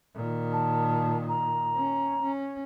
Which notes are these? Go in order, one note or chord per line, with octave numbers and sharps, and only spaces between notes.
A#2 D#3
A5
A#5
C#4
C#4